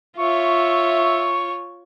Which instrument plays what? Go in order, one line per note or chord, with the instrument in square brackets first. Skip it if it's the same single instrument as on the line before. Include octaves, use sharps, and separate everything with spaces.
[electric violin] F4 C#5 [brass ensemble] E5 [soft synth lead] C#6